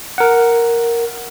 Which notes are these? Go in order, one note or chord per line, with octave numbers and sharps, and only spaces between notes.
A#4 F#5